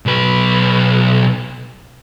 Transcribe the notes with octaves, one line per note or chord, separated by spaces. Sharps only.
B1 B4